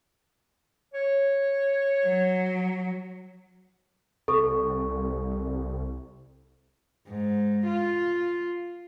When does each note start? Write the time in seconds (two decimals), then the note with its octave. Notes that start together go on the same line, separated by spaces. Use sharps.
0.94 C#5
2.06 F#3
4.28 C2 A4 C#6
7.08 G#2
7.66 F4